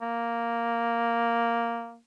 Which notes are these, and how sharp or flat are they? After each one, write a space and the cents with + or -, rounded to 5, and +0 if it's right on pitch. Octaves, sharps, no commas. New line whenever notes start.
A#3 +0